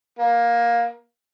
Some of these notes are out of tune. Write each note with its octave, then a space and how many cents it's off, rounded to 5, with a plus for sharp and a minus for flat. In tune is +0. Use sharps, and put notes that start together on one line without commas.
A#3 +15